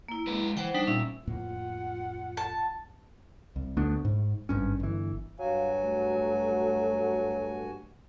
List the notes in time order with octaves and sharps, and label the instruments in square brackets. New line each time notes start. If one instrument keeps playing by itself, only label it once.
[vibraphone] A#3 E4
[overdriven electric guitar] G#3 B4
[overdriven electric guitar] E3 [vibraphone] C5 F#5 G5
[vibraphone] G3 D#4 [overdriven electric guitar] D4
[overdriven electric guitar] A#2 [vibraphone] C#4 E5 E6
[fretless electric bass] F2 A2 A#3 [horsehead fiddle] F4 F#5
[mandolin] A5
[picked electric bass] C2
D2 A3 B3 D4
G#2
G#1 G2 C#4
G1 E3
[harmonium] G2 F#4 G#5 [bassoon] F#3 [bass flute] F5
[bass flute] A3